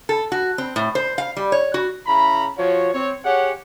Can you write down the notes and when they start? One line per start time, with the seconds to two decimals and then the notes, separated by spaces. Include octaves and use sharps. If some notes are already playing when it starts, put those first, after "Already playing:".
0.09 A4
0.32 F#4
0.58 C4
0.76 A2
0.95 C5
1.18 F5
1.37 G3
1.52 C#5
1.74 F#4
2.07 C#3 E4 A#5 B5
2.58 F3 F4 F#4 C#5
2.94 C4 C#5
3.25 G4 G#4 C#5 F#5